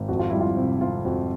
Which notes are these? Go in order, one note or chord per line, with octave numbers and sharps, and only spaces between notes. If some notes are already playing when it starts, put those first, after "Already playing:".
Already playing: G#1
F2 F#4
F4
G3 E4
F4
C3
C3 F4
F2 F#4